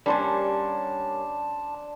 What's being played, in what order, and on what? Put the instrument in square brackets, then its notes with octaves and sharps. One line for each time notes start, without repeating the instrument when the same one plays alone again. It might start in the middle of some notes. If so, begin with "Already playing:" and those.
[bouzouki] G3 A#3 C#4 [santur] D4 C5 D5 [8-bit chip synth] A5